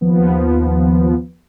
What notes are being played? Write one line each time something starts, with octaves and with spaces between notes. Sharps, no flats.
D#2 F3 B3